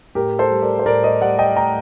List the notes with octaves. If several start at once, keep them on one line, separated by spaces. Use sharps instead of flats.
A2 G4 A#4
A4 C5
G3
A#4 D5
C5
A2 A#4 D5
C5 D#5
G3 D5 F#5
D#5 G5
A2 G5 A#5